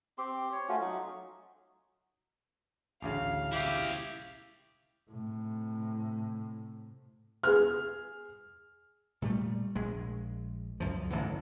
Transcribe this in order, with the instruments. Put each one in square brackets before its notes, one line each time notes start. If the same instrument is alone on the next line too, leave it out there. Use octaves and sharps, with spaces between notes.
[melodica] C4 G4 C6
C#5
A3 C#4 F4 F#4
F#3 D#4
[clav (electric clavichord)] A1 D2 C#3 [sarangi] F5
[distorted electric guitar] E4 G5 [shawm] G4
[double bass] A2 C3
[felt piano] G#4 F6
[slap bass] A#2 G3 A3
A#1 G#3
C#2 F#2 F3
A1 G#2 D3 E3